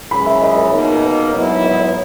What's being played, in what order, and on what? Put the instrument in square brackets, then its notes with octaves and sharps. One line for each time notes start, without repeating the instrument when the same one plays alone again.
[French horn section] F#2 C#3 E3 G#3 [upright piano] B5
[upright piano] E5
D#5
C#5
[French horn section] B2 A#3 D#4
[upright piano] B4
[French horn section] G#2 F#3 B3 E4 [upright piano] C#5
[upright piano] D#5
C#5